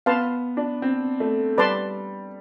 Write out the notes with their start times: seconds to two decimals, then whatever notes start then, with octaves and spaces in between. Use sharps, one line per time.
0.06 B3 B4 F5 A5 C6
0.57 D4
0.82 C4
1.20 A3
1.57 G3 B4 D5 A5 C6